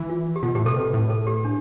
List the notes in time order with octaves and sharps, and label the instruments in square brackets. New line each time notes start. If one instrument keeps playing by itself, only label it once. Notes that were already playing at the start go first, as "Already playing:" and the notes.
Already playing: [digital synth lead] E3
[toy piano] F4
G4
[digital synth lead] B2 [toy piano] F4
[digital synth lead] A2 [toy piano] G4
[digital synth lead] B2 [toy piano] A4
[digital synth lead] C3 [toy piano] B4
[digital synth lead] A2
[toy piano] A4
G4
D4